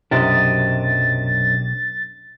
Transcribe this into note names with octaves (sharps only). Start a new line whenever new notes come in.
B1 F#2 C3 D4 G4 D#5 A6